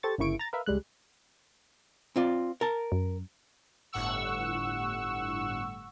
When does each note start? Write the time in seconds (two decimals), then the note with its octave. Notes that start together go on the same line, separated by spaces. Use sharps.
0.03 G4 A4 C5 C#6 A6
0.18 G1 C#3 A#3 E4 C#6 D7
0.39 A#5 A6
0.53 A#4 B4 E5 F5
0.66 C#2 G3 G#3 F#6
2.16 C4 F4 D5
2.61 A#4 A5
2.92 F#2
3.93 G1 A2 F#5 C#6 E6